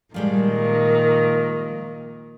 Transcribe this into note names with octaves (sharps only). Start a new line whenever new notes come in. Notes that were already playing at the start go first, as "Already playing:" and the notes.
A#2 D#3 F3 G3 G#3